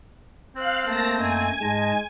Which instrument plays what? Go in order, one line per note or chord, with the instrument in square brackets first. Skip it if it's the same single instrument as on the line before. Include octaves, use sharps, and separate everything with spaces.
[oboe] C4 [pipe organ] C5 [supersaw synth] F5 F#6
[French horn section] A3 A#3 [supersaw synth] A5 A#6
[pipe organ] F#2 D#5 [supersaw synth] G#5
[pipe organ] G#2 A5 A#6 [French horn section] G#3